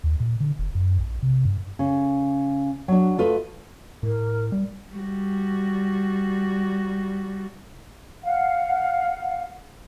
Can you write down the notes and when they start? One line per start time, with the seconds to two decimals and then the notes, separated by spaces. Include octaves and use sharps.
0.04 D#2
0.20 A#2
0.40 D3
0.59 F1
0.75 F#2
0.99 A#1
1.22 C3
1.45 G2
1.79 C#3
2.88 F#3 D4
3.18 A3 F4 B4 D#5
4.03 A2 A#4
4.52 G3
4.93 G3 F#4
8.23 F5 F#5